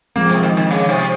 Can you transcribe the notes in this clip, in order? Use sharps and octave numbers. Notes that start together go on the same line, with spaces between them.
F3 G#3 A#3 C4
C3
D#3
D#3
C#3
C3